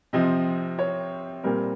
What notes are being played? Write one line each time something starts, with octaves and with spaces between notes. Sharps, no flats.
C3 F3 C4 D#5
C#5
A#2 G3 C4 A#4